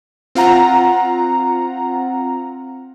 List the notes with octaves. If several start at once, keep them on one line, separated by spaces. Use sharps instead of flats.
C4 F4 F#5 A#5